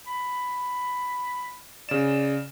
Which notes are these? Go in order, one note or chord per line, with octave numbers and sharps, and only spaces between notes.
B5
C#3 D5 E7